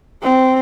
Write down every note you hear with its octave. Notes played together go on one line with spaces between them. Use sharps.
C4